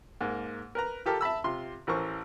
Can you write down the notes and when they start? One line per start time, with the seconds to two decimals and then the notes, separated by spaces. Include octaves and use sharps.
0.21 G#2 A#3
0.75 A#4 B4 A#5
1.06 F4 G4 A4 A#4 D6
1.21 E5 A5 B5 E6
1.44 C3 F4 C6
1.87 A1 E3 A#4 C5 C#6